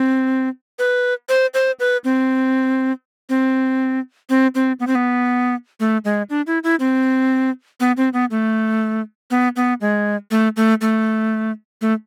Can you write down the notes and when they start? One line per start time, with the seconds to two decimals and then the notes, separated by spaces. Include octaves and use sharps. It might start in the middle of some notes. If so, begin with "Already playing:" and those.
Already playing: C4
0.79 B4
1.29 C5
1.54 C5
1.80 B4
2.04 C4
3.29 C4
4.30 C4
4.55 C4
4.80 B3
4.87 C4
4.95 B3
5.80 A3
6.05 G#3
6.30 D4
6.47 E4
6.64 E4
6.80 C4
7.80 B3
7.97 C4
8.13 B3
8.31 A3
9.31 B3
9.56 B3
9.81 G#3
10.31 A3
10.57 A3
10.81 A3
11.81 A3